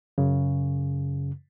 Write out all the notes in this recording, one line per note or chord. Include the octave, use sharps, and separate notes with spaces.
F#2 C#3